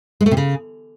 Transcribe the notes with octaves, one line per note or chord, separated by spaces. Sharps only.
G#3
A3
C3
C#3